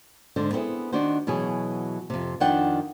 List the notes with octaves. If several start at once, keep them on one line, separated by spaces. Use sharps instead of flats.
G#2 D3 C5
B3 C4 E4 G#4
D#3 D4 D#4 F#4 C5
B2 E3 F#3 G#4
F2 C3
F2 D#3 D4 F4 F#5 G5